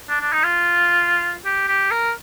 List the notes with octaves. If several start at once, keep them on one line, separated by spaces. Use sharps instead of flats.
D4
D4
D#4
F4
G4
G4
A#4